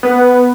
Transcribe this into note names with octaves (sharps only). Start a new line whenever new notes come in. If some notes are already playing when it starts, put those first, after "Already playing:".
B3